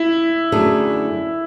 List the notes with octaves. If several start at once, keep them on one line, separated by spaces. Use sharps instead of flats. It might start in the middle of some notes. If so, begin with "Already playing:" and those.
Already playing: E4
F#2 D3 A3 D4 G#4